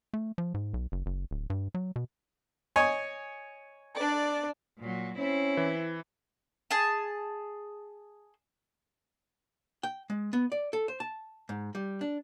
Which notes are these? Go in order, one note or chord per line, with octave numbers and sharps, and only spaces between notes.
A3
F3
G#2
B1
F#1
F#1
D1
G2
F#3
B2
C#5 D#5 G#5
D4 D5
A#2 F#3
C4 C#4 E4
E3
G#4 A5
G5
G#3
B3
D5
A4
C5
A5
G#2
G3
D4